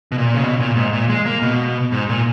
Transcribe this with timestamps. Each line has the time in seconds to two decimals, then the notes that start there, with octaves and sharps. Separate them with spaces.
0.12 B2
0.18 A#2
0.35 C#3
0.43 B2
0.60 A#2
0.76 G#2
0.93 A#2
1.09 G#3
1.26 A#3
1.42 B2
1.92 G#2
2.09 A#2